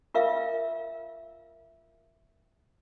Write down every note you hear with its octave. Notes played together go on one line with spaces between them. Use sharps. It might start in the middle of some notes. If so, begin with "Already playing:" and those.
F4 A#4 E5 F5